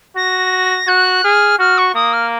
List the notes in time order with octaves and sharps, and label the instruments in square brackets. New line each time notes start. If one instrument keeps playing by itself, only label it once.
[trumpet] F#4 [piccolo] A#6
[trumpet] F#4 [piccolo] F#6
[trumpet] G#4 [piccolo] F6
[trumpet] F#4 [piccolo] F6
[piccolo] C#6
[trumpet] A#3 [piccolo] D#6
[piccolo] F6